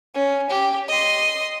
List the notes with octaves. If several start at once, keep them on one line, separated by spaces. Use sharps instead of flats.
C#4
G4
D#5 C6